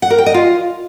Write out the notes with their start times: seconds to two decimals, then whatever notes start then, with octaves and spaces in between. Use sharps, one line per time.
0.02 F#5
0.10 A#4
0.18 G5
0.26 D#5
0.34 F4